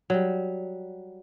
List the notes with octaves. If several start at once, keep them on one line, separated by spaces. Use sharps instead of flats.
F#3 G3